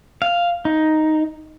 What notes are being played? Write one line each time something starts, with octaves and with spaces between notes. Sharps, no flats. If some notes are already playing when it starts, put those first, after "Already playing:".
F5
D#4